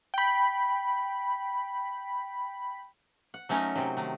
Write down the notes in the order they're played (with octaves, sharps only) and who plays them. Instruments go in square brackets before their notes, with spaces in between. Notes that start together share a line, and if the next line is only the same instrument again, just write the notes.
[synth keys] G5 B5
[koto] F#5
F#3 A3 C#4 D#4 A#4 C#5
C3 F#3
D#3 A3